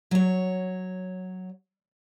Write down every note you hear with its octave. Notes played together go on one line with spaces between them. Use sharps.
F#3 C#5